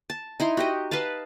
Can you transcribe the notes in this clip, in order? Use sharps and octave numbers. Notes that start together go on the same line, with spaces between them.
A5
D#4 E4 A#5 C6
F#4 G4 D#5
B4 D#5 F5 A5